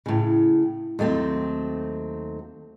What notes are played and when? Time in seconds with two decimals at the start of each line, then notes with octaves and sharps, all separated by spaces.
0.06 A2 C#3
0.99 D#2 F#3 A3 C4